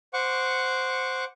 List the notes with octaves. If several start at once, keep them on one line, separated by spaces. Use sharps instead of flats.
C5 F#5 C#6 D6